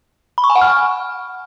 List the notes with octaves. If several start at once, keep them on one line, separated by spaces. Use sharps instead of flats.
B5
C#6
G#5
F#5
F6